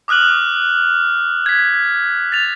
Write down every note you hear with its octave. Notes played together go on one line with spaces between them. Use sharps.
D6 D#6 F6 F#6 F#7
G#6 B6
A6 F7